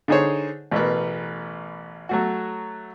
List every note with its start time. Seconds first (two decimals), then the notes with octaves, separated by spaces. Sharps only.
0.08 D3 D#4 G#4 C5 C#5
0.71 A1 B2 A3 A#4 B4
2.09 F#3 A3 F#4